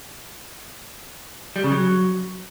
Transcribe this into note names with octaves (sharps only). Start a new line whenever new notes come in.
G3
C#3
F#3